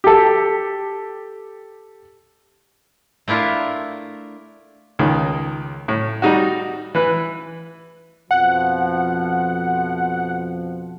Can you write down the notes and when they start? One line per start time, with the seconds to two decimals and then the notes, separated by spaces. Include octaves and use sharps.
0.04 G4 A4
3.28 A3 D4 E4 F4 A#4
4.99 C#2 D#3
5.88 A2
6.22 G3 D#4 F#4
6.95 E3 B4
8.31 F2 B2 F3 F#5